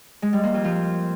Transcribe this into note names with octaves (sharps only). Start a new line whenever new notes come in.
G#3
G3
A#3
F2
F3